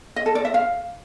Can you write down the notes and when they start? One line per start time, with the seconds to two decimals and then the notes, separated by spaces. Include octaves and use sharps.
0.16 D#5
0.26 A4
0.35 D5
0.45 E5
0.54 F5